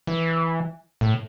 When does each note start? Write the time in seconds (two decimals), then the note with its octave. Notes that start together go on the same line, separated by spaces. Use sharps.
0.07 E3
1.01 A2